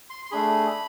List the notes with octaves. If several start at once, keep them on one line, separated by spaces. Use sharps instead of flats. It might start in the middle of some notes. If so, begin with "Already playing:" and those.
C6
C6
A3 D4 G#4 B5